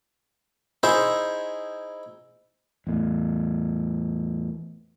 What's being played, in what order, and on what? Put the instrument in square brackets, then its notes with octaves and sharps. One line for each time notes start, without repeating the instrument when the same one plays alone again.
[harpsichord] D#4 E4 G#4 C5 E5
[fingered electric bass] E2 A2